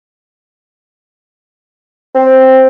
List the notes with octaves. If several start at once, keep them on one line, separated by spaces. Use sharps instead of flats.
C4